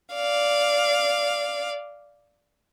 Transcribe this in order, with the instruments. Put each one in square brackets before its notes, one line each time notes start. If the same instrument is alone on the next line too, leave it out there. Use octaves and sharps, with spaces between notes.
[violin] D5 F5